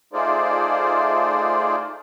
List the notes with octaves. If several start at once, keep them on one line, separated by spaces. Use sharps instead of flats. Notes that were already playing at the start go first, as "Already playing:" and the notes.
A3 D#4 F4 G#4 C5 D5